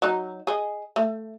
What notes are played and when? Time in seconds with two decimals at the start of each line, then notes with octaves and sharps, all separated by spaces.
0.02 F#3 D#4
0.47 G#4 D#5
0.96 A3